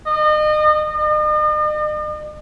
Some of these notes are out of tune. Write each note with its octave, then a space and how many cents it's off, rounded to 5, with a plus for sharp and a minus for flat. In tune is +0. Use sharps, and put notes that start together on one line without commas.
D#5 -35
D#5 -45